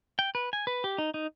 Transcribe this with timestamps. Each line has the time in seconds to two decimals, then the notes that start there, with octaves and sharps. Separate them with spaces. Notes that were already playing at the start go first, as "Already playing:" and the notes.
0.19 G5
0.35 B4
0.53 G#5
0.67 B4
0.84 G4
0.98 D#4
1.14 D#4